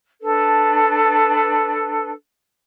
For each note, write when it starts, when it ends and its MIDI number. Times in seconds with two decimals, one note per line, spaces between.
0.22 2.10 62
0.22 2.10 69
0.22 2.10 71